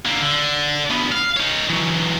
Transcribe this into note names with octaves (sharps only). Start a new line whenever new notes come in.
D3 A#3
D3
D2 B3
F5
D#4 C#5
E3 F#3